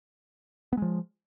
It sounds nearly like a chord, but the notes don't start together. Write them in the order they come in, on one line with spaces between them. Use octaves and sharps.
B3 G#3 F3